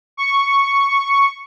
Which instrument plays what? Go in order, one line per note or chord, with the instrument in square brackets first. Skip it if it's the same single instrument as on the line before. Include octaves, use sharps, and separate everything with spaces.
[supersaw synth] C#6